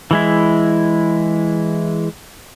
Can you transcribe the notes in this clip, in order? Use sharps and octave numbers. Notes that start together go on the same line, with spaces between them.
E3 G#3 E4